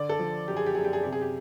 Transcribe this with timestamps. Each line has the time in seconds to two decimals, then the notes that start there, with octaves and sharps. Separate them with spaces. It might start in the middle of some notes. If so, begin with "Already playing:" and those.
Already playing: D3 D5
0.09 A4
0.19 F3
0.48 F#2 G4
0.57 G#4
0.66 G4
0.75 F#2 G#4
0.84 G4
0.93 G#4
1.03 C3 G4
1.12 G#4
1.21 G4